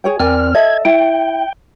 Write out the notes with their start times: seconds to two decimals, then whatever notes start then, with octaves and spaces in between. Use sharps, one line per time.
0.04 G#4 C#5 G5
0.20 E2 C4 A#4 D5 G#5 F6
0.55 A4 D#5 E5 G#6
0.85 E4 G5